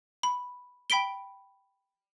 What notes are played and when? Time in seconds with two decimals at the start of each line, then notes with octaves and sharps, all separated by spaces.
0.23 B5
0.90 G5 B5 B6 D7 G7